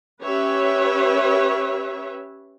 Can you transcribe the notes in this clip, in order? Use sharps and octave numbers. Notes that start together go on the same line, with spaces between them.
C#4 G4 B4 C#5 E5